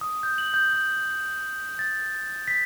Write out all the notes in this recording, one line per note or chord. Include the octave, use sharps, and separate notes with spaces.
D#6
G6
F#7
G6
G6
A6
B6